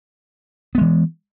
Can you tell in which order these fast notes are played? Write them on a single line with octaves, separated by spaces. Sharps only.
B3 G#3 E3